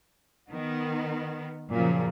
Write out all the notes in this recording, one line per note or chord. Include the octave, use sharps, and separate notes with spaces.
D#3 B3
F#2 A#2 C#3 F3